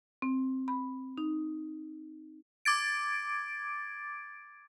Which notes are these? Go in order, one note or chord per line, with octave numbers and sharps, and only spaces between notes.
C4
B5
D#4
D6 G#6 A6 D7